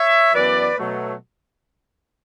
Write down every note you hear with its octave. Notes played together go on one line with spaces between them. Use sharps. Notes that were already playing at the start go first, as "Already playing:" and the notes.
Already playing: C#5 E5
F#2 E3 B3 B4 D5
B2 F#3 A3